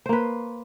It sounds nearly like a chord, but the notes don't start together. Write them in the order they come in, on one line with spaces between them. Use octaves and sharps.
C5 A#3 B4